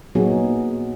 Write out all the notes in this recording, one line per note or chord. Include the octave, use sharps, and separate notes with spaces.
A#2 F#3 B3 D#4 F#4 G#4